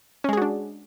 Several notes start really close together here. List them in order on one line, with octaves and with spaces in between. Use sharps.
C#4 G#3 G#4 F#4 D4